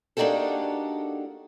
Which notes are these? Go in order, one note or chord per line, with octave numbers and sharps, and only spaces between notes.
A#3 D4 D#4 F#4 G4 A4